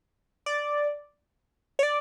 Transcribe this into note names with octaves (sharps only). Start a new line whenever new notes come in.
D5
C#5
D5